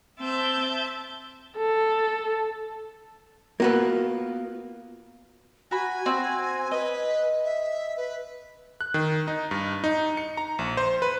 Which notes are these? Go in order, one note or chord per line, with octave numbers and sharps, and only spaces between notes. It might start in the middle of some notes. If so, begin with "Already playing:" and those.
C4 E5 A5 G6
A4
A#3 B3 F4 F#4 A#4 B4
F#4 G#5 B5
C4 F#4
B4 D#5
E5
B4
F#6
D#3
D#4
G2
D#4
C#7
A#5
A#1
C5
B4